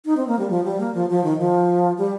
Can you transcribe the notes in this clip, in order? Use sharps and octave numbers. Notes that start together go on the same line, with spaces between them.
D#4
C4
A#3
G3
F3
G3
A#3
F3
F3
D#3
F3
G3